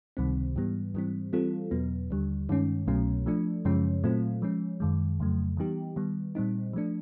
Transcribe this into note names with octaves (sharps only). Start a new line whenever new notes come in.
C#2 C3 D#3 G3 C4
G#2 E3 G3 B3
G#2 E3 G3 C4
E3 G3 C4 F4 A4
E2 B2 F#3 B3
D#2 D3 G3
G2 D#3 G#3 C#4
C2 B2 F#3 A3 C#4
F3 A3 D4
F#2 C#3 F3 G#3 C#4
A#2 F#3 A3 C4 F4
F3 G#3 C#4
F#2 D#3 G#3
F2 C#3 F#3 A3
E3 G3 B3 D#4 G4
D#3 G3 B3
A#2 G3 C4 D#4
F3 A3 D4